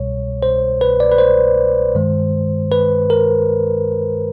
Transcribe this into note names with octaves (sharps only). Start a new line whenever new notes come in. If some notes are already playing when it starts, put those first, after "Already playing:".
Already playing: C2 B2 G3 C#5
C5
B4
D5
B4
C5
G2 D#3 G#3
B4
A#4